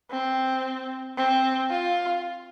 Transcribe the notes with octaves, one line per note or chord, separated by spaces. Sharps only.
C4
C4
F4